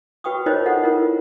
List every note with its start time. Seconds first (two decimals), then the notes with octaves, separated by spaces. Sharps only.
0.24 F#4 B4 G5 C#6 D#6
0.46 D#4 F4 A#4 C5 C#5 D#5
0.66 D#4 A4 F#5
0.84 E4 F4 A#4